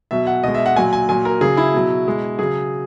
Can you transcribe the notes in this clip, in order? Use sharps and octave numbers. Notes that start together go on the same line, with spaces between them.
B2 F#3 E5
F#5
B2 G#3 D#5
E5
F#5
A#2 F#3 G#5
G#5
A#2 F#3 G#5
A#4
C#3 F#3 G#4
E4
B2 F#3
B2 G#3
C#3 F#3 G#4